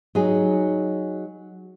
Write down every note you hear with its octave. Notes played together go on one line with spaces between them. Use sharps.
F#3 D#4 G#4